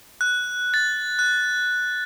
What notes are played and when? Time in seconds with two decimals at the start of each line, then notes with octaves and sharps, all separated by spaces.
0.21 F#6
0.74 A6
1.19 F#6